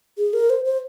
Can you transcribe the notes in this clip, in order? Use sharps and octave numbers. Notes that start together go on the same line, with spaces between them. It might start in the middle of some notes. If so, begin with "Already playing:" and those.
G#4
A#4
C5
C5